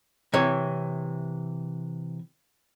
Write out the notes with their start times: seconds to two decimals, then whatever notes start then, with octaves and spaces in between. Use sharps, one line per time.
0.34 C3 E3 C#5